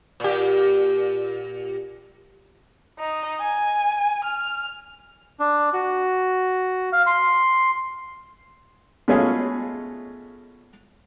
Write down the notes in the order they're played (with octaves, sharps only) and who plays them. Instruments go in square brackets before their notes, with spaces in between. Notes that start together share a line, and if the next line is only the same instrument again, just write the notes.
[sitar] A#2 G4
[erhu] D#4
G#5
F6
[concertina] D4
F#4
F5
C6
[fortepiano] B2 G#3 A3 C#4 F4 G#4